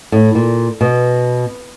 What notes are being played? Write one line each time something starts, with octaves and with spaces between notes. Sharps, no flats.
A2
A#2
B2